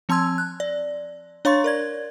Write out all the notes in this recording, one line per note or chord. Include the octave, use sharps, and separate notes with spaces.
F3 C4 A5 C6 E6 G#6
F#6
D5
D4 C#5 F5 C6 C#6 A6
A#4 D5 G#6